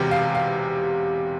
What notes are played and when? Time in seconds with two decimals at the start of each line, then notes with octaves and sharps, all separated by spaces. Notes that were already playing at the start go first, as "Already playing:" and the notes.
Already playing: E1 E2 C3 G5
0.11 F5
0.35 F5